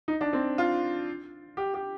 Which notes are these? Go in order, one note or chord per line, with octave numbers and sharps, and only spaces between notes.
D#4
D4
C4
F4
G4
G4